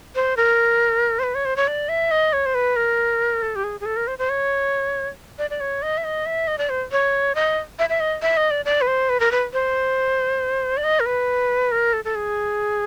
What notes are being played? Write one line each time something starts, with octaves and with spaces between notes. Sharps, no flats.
C5
A#4
C5
B4
C#5
C5
C#5
D5
E5
D#5
C#5
C5
B4
A#4
A4
G4
G#4
G#4
A4
A#4
C5
C5
C#5
D5
D5
C#5
D#5
E5
D#5
E5
D#5
D5
C5
C#5
D#5
E5
E5
D#5
E5
D#5
D5
D5
B4
C5
B4
A#4
B4
C5
D5
D#5
A#4
B4
A#4
A4
A4
G#4